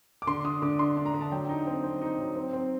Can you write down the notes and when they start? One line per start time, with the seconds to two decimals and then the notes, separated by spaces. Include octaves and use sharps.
0.22 D6
0.27 D3 C6
0.45 D4 D#6
0.62 D3 D6
0.79 D4 C6
0.97 D4
1.06 A#5
1.14 D3
1.21 A5
1.32 F#3 G5
1.49 D#4
1.67 C4
1.83 C4
2.02 D#4
2.18 F#3
2.36 C4
2.53 C4